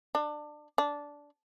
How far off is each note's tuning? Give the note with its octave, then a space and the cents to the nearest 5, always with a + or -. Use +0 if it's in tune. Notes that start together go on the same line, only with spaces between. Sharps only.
D4 +25
D4 -10